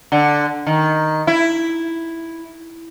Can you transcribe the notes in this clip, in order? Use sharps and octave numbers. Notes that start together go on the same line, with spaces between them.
D3
D#3
E4